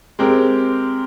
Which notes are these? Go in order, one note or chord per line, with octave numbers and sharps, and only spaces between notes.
G#3 C4 G4 A#4